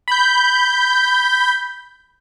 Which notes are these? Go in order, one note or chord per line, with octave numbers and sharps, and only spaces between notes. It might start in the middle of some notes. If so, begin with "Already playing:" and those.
B5 G6